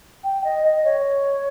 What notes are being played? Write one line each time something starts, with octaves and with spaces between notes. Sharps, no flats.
G5
D#5
D#5
C#5